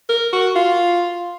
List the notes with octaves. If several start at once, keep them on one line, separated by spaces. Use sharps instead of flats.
A#4
F#4
F4